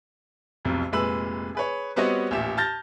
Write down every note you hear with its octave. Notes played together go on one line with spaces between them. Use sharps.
F1 B1 F2
F1 A#2 G#3 B4 E6 F#7
G#4 B4 C#5
G3 B3 C4 F#4 C#5 D#5
A1 D#2 A#2 G4 E5 E7
A5 F6 G6 A6 A#6